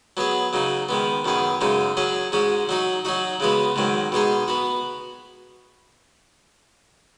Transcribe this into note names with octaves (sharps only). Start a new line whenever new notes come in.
F#3 B3 G#4
C#3 F#3 D#4
D#3 G#3 B3
F#2 D#3 B3 G#4
F#2 C#3 G#3 D#4
F#3 C#4 G#4
G#2 G#3 C#4 F#4
F#3 D#4 F#4
F#3 D#4 F#4
C#3 G#3 B3 F#4
G#2 D#3 F#3
B2 G#3 D#4 G#4
B3 F#4